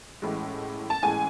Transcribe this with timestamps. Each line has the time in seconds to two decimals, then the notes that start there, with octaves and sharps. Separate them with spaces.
0.22 A1 A2 E3 G#3
0.90 A5
1.02 A1 A2 E3 G#3 G#5